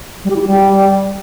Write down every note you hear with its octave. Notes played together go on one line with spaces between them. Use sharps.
G3
G4
E4
G4
G3